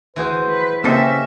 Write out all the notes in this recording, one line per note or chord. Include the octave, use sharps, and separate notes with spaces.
D2 E3 F#4 G#4 C5
B4
C#3 A#3 C4 C#4 G4 A4 D#5 E5